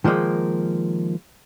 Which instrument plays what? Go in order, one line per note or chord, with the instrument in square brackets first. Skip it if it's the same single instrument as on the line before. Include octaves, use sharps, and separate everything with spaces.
[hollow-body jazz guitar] D#3 F3 G#3 A#3